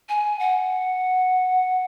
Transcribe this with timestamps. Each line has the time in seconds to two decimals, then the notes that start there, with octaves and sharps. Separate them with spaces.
0.09 G#5
0.39 F#5